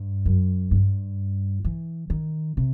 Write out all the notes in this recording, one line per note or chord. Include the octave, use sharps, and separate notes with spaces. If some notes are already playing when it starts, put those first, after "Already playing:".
Already playing: G2
F#2
G2
E3
D#3
C3